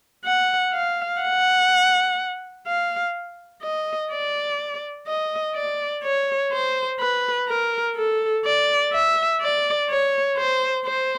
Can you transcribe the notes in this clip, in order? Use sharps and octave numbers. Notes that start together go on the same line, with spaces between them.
F#5
F5
F#5
F5
D#5
D5
D#5
D5
C#5
C5
B4
A#4
A4
D5
E5
D5
C#5
C5
C5